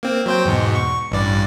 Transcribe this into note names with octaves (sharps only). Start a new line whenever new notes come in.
A#3 C4
F#3 C5 G5
E2 G#2 B2
C#6
A1 G2 D5